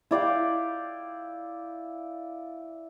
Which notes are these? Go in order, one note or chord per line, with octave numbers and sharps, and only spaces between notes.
E4 D5 F5 G5